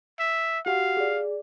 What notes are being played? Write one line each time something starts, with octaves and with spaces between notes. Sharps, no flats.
E5
F#4 G4 F5 F#5
G#4 D5